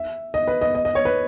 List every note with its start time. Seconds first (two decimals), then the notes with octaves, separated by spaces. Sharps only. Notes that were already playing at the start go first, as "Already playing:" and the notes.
Already playing: E5
0.34 D#5
0.47 B4
0.61 D#5
0.75 D#5
0.85 D#5
0.95 C#5
1.05 B4